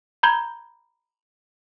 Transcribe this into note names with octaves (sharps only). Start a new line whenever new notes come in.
A#5 B5 G6 G#6 G7